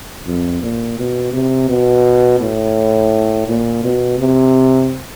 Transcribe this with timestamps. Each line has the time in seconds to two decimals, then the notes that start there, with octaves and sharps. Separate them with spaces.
0.27 F2
0.62 A#2
0.98 B2
1.33 C3
1.69 B2
2.40 A2
3.47 A#2
3.84 B2
4.19 C3